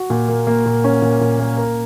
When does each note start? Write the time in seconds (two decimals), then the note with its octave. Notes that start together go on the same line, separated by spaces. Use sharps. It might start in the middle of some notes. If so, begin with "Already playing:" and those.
Already playing: F#4
0.10 A#2
0.28 A#3
0.47 A#3
0.66 A#2
0.84 C#4
1.02 A#2
1.21 A#2
1.39 A#3
1.57 A#4